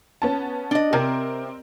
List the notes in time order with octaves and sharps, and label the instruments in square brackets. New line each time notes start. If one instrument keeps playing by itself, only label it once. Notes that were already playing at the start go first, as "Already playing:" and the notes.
[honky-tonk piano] B3 C#4 A5
[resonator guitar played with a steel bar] D4 D#5
[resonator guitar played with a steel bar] C3 [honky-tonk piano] C4 A#4